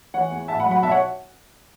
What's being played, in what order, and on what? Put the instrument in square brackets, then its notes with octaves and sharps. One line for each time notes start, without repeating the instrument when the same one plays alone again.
[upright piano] E3 C#5 F#5
E2
A1 E5 A5
F#5 B5
F#3
F#5 B5
B1 E5 A5
C#5 F#5